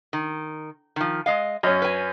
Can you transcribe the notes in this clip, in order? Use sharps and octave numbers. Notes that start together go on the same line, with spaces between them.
D#3
D#3 F3
G#3 D#5 F5
F#2 C#4 D#5
B4 G#5